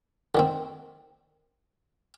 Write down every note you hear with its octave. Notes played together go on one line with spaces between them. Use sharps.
D3 D#3 C4